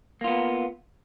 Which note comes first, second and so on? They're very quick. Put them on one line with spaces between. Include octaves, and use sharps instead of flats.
A#3 F4 B3